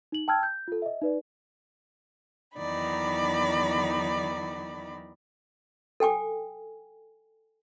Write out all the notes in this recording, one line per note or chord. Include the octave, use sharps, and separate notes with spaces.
D#4 F#7
G5 A5 E6 F6 G#6
G6
F4 A4
D#5 E5
D#4 B4 D5
E2 D#3 F#3 D#4 D5 B5
A4 G5 G#5 D6